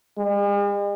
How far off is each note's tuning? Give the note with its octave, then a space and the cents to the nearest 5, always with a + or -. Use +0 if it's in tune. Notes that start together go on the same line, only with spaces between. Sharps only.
G#3 -45